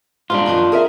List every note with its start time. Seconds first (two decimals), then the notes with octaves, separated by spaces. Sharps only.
0.30 G#2 G3 D4 F4
0.46 F#2 D#3 F3
0.72 G#4 A#4 E5